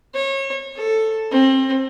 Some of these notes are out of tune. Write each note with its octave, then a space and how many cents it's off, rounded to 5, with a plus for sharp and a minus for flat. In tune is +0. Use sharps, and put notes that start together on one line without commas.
C#5 -30
A4 +5
C4 +30